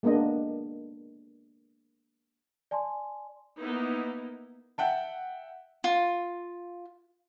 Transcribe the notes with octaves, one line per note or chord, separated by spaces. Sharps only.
G#3 A#3 B3 D4 D#5
D5 G#5 A5 C6
A#3 B3 D#4 E4
E5 F#5 G5 A5
F4